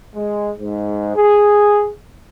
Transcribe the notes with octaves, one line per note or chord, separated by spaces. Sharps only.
G#3
G#2
G#4